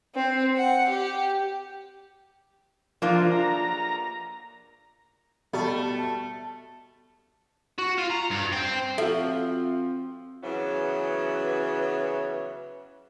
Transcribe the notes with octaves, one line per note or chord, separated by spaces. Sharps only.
C4
F#5
G4
F3 A#3 D4 F4
A#5
B2 G3 A3 B3
F#4
F4
A#5
G2
C5 G5
F3 C4 F#4 A4 E5
C#3 E3 F#3 B3